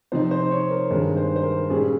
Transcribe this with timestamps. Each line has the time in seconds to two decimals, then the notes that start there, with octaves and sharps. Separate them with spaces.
0.12 C3 F3 C4 D#4 C5
0.31 C5
0.51 C#5
0.71 A#4
0.90 G2 D#3 G#3 C4 A#4
1.17 C5
1.36 C5
1.43 A#4
1.70 A#2 G3 C#4 G#4